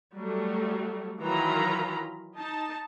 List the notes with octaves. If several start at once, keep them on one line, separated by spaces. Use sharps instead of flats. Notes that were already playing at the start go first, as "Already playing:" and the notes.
F#3 G3 A3
D#3 E3 F#3 F4 A#5 B5
D#4 A5